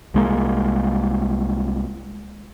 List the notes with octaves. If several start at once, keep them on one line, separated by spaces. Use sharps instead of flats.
C2 G#3 A#3